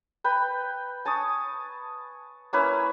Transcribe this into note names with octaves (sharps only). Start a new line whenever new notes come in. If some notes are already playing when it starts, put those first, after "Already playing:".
B4 G5 B5
G#5 A5 C#6 D#6
A#3 C#4 E4 B4